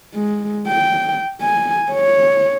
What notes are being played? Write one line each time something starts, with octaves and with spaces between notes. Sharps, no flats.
G#3
G5
G#5
C#5